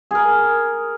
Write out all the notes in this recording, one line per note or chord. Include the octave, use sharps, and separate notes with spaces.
G#4 A#4